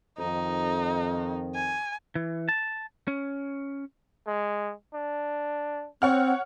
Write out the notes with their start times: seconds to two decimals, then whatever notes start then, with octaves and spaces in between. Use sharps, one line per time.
0.18 F2 D#3 D#4
1.55 G#5
2.16 E3
2.49 A5
3.08 C#4
4.27 G#3
4.94 D4
6.02 C4 C#5 F#5 F6